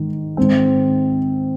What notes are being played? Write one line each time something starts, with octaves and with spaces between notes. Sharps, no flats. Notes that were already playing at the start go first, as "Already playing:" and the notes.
Already playing: G#2 D#3
G#2 D#3 C4